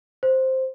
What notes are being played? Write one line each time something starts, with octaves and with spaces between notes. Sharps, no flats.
C5